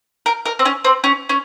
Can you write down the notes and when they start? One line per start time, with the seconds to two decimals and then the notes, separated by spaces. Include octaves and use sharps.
0.26 A#4
0.46 A#4
0.59 C4
0.65 C#4
0.85 C4
1.04 C#4
1.29 C#4